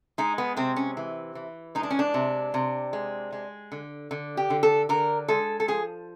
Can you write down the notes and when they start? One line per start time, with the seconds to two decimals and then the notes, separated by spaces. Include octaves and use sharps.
0.18 G#3 D#4
0.38 B3
0.57 C3 C4
0.76 C#4
0.97 E3
1.35 E3
1.75 G#3 D#4
1.83 D4
1.91 C#4
1.99 D4
2.14 C3
2.54 C3
2.93 G#3
3.32 G#3
3.72 D3
4.11 D3
4.37 G4
4.50 D3
4.63 A4
4.89 D3 A#4
5.28 G#3 A4
5.60 A4
5.68 F3 G#4